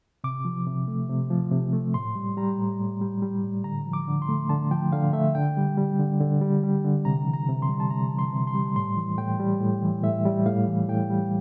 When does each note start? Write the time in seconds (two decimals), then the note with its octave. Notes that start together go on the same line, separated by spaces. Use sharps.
0.24 C3 D6
0.45 F3
0.67 C3
0.88 A3
1.10 C3
1.31 F3
1.52 C3
1.73 A3
1.94 A2 C6
2.16 G3
2.37 G3 A#5
2.58 A2
2.80 A2
3.01 G3
3.22 G3
3.43 A2
3.64 D3 A#5
3.86 F3
3.93 D6
4.07 D3
4.22 C6
4.29 A3
4.49 D3 A5
4.71 F3 G5
4.92 D3 F5
5.13 A3 E5
5.35 D3 G5
5.57 G3
5.77 G3
5.99 D3
6.20 D3
6.41 G3
6.63 G3
6.85 D3
7.05 C3 A#5
7.26 E3
7.33 A#5
7.49 C3
7.62 C6
7.69 G3
7.80 A5
7.90 C3 A#5
8.12 E3
8.19 C6
8.33 C3
8.47 C6
8.54 G3
8.76 A2 C6
8.97 E3
9.18 A2 G5
9.39 G3
9.61 A2
9.82 E3
10.03 A2 E5
10.25 G3
10.46 A2 F5
10.68 E3
10.89 A2 G5
11.10 G3